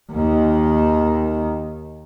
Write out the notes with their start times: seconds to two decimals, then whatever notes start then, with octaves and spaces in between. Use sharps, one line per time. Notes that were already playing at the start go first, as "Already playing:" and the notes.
0.11 D#2 D#3